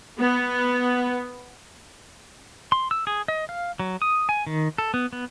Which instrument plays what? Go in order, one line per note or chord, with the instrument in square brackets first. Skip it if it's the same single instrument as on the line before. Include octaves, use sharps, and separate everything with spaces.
[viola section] B3
[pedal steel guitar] C6
E6
G#4
D#5
F5
F#3
D#6
G#5
D#3
A4
B3
B3